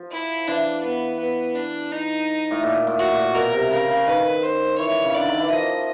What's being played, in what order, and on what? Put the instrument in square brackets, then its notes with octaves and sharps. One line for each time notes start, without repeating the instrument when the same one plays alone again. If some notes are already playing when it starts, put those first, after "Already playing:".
Already playing: [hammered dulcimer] F3
[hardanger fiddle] E4
[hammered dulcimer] E3 [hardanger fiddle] D4
[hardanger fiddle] B3
B3
D4
D#4
[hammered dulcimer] A2
A#2
A2
[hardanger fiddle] F#4
[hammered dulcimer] A#2
[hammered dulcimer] B2 [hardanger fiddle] A#4
[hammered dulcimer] C3
[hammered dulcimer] C#3 [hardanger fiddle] A#4
[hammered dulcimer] C#3
[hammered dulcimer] D#3 [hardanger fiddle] B4
[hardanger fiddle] C5
[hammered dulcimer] E3 [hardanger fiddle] C#5
[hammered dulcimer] C#3
[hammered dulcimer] D3 [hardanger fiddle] D5
[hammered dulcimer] D#3
E3
[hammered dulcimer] F3 [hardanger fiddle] D#5